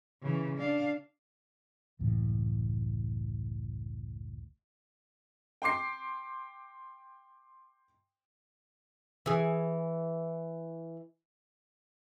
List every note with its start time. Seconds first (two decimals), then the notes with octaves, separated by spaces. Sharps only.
0.22 C#3 E3
0.58 D4 F5
1.99 F#1 C#2 A2 E3
5.62 G5 C6 D6 C7
9.26 E3 G#4